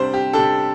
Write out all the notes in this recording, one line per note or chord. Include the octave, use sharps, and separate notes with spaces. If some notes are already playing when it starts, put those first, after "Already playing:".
Already playing: C3 G3 D4 C5
G4
C3 G3 D4 A4